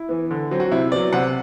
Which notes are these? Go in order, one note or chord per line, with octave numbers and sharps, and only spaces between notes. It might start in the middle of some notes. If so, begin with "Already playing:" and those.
Already playing: E4
E3 B3
D3
F#3 C4
F#4
C3 E4
F#3 B3 D5
C3 F#5